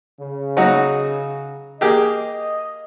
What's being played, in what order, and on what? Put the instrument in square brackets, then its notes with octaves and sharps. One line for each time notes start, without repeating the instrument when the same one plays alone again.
[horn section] C#3
[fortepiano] F#3 D#4 F#4
[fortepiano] A#3 G4 G#4 [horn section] D#5